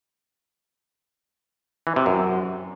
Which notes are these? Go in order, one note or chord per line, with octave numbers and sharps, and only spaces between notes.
E3
C3
F#2